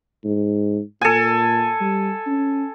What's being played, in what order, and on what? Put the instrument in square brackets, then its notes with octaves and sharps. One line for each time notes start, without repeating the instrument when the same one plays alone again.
[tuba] G#2
[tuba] A#2 [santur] A4 G#5
[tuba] G3
C#4